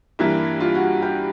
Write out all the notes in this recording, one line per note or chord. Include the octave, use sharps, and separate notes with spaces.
G2 E3 G3 A#3 E4
F4
F#4
G4